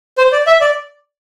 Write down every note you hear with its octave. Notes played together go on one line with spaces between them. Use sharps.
C5
D5
E5
D5